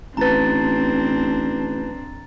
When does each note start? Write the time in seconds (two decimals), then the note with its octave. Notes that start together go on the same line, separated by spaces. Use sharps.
0.17 A1 C4 D4 B4 A5 A#5 A6